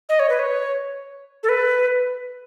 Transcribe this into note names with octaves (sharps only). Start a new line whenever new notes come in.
D#5
C#5
B4
C#5
A4
B4